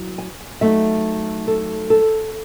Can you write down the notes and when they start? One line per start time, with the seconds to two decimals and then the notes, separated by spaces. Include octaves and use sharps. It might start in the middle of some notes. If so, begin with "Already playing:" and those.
Already playing: F#3 E4
0.18 G#5
0.61 F#3 A3 D#4 E5
1.48 A4
1.90 A4